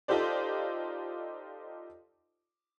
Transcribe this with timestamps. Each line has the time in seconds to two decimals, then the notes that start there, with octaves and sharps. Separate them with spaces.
0.08 D#4 F4 G4 A4 C5 D5